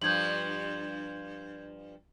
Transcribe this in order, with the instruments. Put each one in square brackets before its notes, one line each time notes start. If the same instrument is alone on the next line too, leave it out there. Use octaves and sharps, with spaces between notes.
[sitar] G2 F3 [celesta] G6 G#6 F#7